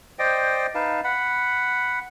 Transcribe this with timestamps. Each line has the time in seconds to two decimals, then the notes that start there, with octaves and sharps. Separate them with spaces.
0.19 C5 D5 D#5 G5
0.75 D#4 B4 F5 A5
1.04 F#5 B5